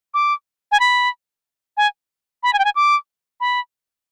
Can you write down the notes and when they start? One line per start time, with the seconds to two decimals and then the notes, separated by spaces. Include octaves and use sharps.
0.14 D6
0.72 G#5
0.80 B5
1.77 G#5
2.43 B5
2.53 G#5
2.59 G5
2.65 G#5
2.76 D6
3.40 B5